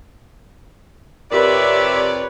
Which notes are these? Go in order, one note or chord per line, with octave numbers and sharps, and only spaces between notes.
F2 C3 G4 A#4 B4 C#5 D5 E5